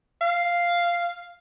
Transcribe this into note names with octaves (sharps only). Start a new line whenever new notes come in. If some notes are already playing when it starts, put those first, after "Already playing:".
F5